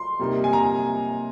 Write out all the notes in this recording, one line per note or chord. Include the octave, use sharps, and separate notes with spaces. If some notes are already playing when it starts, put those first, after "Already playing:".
Already playing: C6
C3 G3 A#3 D#4
G#5
A#5